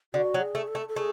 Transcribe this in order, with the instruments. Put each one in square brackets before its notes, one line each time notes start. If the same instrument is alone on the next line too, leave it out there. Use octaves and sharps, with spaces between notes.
[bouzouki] D3 [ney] F#4
[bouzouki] F#3
[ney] G#4
[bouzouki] A3
[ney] A4
[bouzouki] A3
[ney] A4
[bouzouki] A3 [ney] G#4